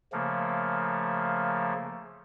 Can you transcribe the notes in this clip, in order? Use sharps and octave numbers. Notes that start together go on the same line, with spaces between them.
C#3 F3 A3 A#3